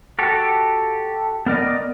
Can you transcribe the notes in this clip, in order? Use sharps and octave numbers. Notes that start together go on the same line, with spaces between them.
F#4 G4 A4
B3 A#4 D5 D#5